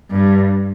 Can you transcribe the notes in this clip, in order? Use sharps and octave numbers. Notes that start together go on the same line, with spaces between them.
G2